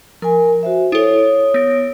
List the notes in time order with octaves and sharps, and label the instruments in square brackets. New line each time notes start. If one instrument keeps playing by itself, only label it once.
[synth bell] F3 [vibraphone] A#4 G#5
[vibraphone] F#4 C5 E5
[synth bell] E4 A4 [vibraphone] C#5 D#6
[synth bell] B3 A#6 D7